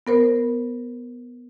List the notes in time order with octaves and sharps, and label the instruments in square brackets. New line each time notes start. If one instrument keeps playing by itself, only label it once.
[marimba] B3 A#4 C5